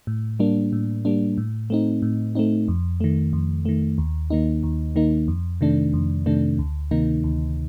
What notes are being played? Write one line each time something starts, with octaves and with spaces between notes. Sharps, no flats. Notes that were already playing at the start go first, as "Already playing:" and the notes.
A2
G3 A#3 D4
A2
G3 A#3 D4
A2
A3 C4 D#4
A2
A3 C4 D#4
F2
D#3 A3
F2
D#3 A3
D#2
D#3 A#3 D#4
D#2
D#3 A#3 D#4
F2
C3 D#3 A3 D4
F2
C3 D#3 A3 D4
D2
C3 D#3 A#3 D#4
D2